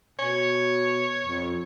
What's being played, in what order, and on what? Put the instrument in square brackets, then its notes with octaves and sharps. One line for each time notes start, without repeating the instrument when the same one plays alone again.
[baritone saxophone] B2 [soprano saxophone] C#5
[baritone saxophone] F2